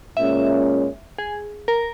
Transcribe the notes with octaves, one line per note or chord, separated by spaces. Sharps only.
A#2 G#3 C#4 E5
G#4
A#4